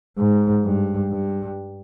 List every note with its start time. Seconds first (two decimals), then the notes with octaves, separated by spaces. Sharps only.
0.17 G#2
0.65 G2
1.12 G2